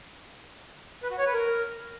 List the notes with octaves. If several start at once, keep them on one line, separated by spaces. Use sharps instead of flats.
B4
F#4
C#5
B4
A#4